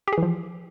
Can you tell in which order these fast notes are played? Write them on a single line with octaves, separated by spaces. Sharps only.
G4 G#4 E3 F3